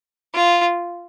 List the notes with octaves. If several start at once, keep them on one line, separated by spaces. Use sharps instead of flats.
F4